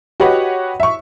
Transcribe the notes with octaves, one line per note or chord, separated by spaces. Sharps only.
F#4 G4 B4 C#5 D#5 F#5
E5 C#6